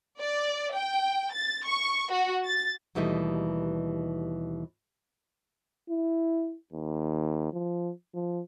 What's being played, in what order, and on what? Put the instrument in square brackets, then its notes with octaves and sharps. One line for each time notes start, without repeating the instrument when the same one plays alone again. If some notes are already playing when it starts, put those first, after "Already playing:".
[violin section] D5
G5
A6
C#6
F#4
A6
[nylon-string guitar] D#2 B2 E3 G3 A3 D#4
[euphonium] E4
D#2
F3
F3